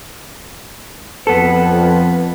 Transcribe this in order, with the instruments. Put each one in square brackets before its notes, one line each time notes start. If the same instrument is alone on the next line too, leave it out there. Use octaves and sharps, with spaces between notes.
[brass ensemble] F2 B4 [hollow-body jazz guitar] B3 A4